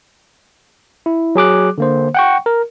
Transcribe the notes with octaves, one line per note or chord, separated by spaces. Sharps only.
E4
F#3 G#4 D6 F#6
D3 A#3 C5
F#5 G5 C#6
A#4